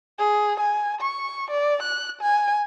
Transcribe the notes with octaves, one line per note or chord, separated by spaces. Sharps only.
G#4
G#5
C#6
D5
F#6
G#5